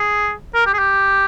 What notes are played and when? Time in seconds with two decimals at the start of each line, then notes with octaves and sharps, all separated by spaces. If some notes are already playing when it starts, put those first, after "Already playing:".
Already playing: G#4
0.55 A#4
0.67 G4
0.74 G#4
0.79 G4